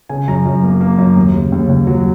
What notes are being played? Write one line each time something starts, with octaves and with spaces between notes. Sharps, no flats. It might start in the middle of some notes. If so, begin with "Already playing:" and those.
C#3 G#5
F#2 A#5
F#2
A#3
A#3
F#2
D#2
C#3
D#2
D#2
F#3